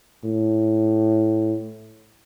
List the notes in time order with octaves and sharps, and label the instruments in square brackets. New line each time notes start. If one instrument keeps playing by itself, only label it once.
[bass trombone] A2